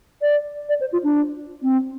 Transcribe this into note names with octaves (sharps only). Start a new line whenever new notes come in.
D5
D5
C5
F4
D4
C4